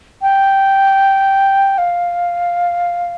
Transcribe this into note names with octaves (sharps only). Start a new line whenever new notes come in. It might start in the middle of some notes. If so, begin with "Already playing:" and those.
G5
F5